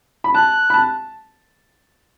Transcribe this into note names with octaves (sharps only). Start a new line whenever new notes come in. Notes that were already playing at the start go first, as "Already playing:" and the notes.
B5
A5 F#6
B5
A5